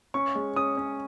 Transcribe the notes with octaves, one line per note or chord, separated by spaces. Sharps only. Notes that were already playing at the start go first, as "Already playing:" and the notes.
C#4 C#6
G#3
C#4 D#6
C#4